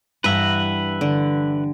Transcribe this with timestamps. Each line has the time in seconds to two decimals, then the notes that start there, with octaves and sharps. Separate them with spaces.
0.24 G2 E3 B4 E5 F#5 A#5
1.01 D3